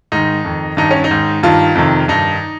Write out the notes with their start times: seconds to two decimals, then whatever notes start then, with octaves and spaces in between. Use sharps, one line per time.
0.12 G#2 D#3 D#4
0.45 F2 D#3
0.77 G2 D#3 D#4
0.91 C#4
1.04 D#4
1.11 G#2 D#3
1.43 G2 D#3 F4
1.75 F2 C3 D#3
2.08 G2 D#3 D#4